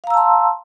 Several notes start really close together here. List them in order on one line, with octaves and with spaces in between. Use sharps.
F5 A#5 E6 A5 C6